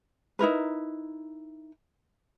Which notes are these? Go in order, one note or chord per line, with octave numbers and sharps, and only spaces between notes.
D#4 E4 A#4 B4